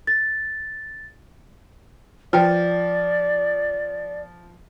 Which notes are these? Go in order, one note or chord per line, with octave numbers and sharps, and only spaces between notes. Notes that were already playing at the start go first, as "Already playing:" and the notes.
A6
F3 B4 D5 G5 A5